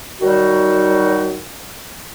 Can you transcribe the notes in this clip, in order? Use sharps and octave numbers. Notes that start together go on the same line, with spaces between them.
D#3 F#3 G3 D#4 F#4